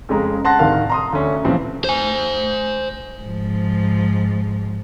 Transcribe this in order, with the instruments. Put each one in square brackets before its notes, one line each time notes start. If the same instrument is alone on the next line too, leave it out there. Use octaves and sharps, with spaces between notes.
[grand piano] F2 C#3 G#3 A#5
F#5 A5 C6 F#6 A#6
D1 C3 D#3 A#4 F5
A#5 C6 D#6
D2 C#4
A#2 C#3 E3 F3 C4
[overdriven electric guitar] C5 G#5
[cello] G#2 F3